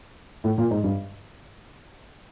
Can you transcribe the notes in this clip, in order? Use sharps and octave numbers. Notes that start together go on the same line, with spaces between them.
A2
A#2
G#2
G2